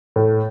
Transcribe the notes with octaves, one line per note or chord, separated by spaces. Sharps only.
A2